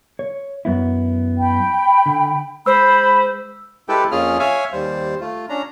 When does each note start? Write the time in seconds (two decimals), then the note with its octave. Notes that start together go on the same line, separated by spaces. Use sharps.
0.19 C#5
0.65 F#2 B3 E4
1.38 G5 B5
2.06 D3
2.66 G#3 C5 B5 E6
3.89 G#3 E4 G4 A4 B4 G5
4.11 F2 A#3 C#4 F4 G#4 F6
4.39 C#5 E5 F5 G#5
4.73 D#2 G3 C5
5.21 A3 F4
5.49 C#4 D4 A#5